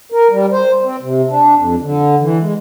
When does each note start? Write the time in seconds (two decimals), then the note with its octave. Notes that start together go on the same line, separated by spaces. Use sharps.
0.12 A#4
0.31 G3
0.52 C5
0.84 C4
1.02 C3
1.30 D4
1.56 F2
1.82 D3
2.21 E3
2.40 G#3